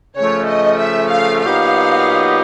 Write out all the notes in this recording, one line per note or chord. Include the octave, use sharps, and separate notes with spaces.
C#3 F3 A3 C#5
D#5
E5
F5
A#2 F#3 B3 D#4 G4 F5